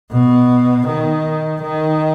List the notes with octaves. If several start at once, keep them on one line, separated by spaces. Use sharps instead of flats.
B2
D#3
D#3